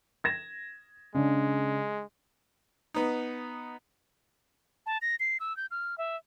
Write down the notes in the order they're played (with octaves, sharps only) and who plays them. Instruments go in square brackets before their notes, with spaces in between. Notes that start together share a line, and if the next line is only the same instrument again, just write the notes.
[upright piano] G#6 A#6 E7
[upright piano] C#3 D4 [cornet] G#3
[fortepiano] B3 D#4
[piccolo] A5
A#6
C7
E6
G6
F6
E5